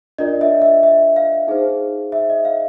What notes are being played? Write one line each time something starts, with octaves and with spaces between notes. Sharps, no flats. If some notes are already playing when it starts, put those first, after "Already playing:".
D4 F4 A#4 D5 D#5
E5
E5
E5
F5
D#4 G#4 C5
E5
D#5
F5